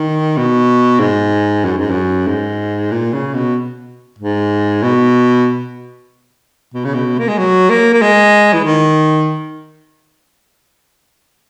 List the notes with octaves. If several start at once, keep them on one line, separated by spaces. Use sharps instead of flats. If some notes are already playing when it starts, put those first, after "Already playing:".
Already playing: D#3
B2
G#2
F#2
G#2
F#2
G#2
A#2
C#3
B2
G#2
B2
B2
C#3
B2
A#3
G#3
F#3
A#3
A#3
G#3
E3
D#3